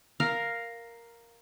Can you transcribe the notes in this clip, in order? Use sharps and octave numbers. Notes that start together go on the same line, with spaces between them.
A#4 F5